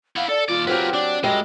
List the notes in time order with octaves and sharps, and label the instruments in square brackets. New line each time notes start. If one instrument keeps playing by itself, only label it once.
[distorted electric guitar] E4 F#5 [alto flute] F5
[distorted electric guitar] A4 [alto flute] D5
[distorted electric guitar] D#2 D5 [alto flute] F4
[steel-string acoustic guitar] F#3 C4 G4 [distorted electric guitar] A#4 B4
[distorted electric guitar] D4 [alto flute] D5
[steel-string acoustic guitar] F#2 G3 E5 [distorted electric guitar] G#3 [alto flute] D#5